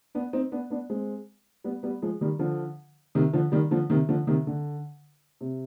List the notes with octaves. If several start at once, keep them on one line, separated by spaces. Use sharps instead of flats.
B3 D4
C4 D#4
B3 D4
B3 D4
G#3 C4
G3 B3
G3 B3
F3 G#3
D#3 G3
D3 F3
C3 D#3
D3 F3
D#3 G3
D3 F3
C3 D#3
D3 F3
C3 D#3
D3
C3